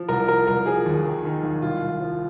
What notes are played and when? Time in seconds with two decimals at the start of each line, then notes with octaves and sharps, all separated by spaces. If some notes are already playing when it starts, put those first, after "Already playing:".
Already playing: F3
0.09 C2 A#4
0.28 F3 A#4
0.47 C2 A#4
0.66 F3 G#4
0.86 D#2
1.05 D#3
1.25 D#3
1.43 D#2
1.62 C2 F4
1.82 C2
2.01 F3